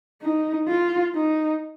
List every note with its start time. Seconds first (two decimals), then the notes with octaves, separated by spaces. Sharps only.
0.22 D#4
0.68 F4
1.15 D#4